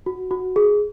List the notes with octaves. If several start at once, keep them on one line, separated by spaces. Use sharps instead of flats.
F#4
F#4
G#4